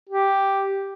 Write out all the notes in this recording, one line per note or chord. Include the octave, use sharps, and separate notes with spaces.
G4